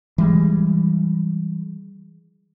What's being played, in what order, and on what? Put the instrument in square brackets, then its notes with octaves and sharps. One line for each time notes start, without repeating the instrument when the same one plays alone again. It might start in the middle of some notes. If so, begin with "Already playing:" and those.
[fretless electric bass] E3 G3 G#3